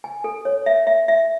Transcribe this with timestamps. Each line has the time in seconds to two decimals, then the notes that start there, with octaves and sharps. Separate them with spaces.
0.04 G#5
0.24 A4
0.45 C#5
0.66 E5
0.87 E5
1.08 E5